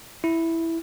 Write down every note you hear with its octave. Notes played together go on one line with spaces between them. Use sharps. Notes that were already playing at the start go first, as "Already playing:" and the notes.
E4